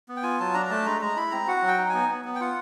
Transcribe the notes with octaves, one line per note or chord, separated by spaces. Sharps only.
B3
G5
F4 G#5
F#3 A5
D4 A#5
A#5
A3 A5
G#3 A#5
G#3 A#5
E4 B5
C4 A#5
F#4 F#5
F#3
G5
D#4
B3 G#5
B3
B3
G5
F4 F#5